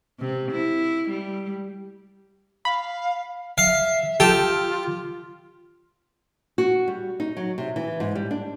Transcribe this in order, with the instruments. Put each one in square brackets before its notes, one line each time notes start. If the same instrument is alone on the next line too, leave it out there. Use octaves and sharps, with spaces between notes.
[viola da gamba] C3
E4
G3
[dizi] F5 [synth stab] B5
[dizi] E5 [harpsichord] F5
[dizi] F4 [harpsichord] G4 [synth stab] A4 G5 E6
[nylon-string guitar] F#4
G3
D#4
F#3
C3
E3
G#2
G3
D4